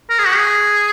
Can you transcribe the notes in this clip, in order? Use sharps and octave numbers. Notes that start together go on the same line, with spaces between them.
A#4
G#4
F#4
G#4